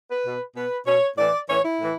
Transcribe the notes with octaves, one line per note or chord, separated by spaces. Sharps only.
B4
B2
B2 B4
B2 C#5
A2 E3 D5
A2 E3 C#5
E4
A2 E3